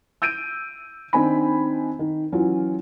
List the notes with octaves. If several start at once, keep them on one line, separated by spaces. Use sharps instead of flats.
E6 G6 D7 D#7
D#3 C4 D4 G#5 B5
D#3
E3 F#3 C#4 F4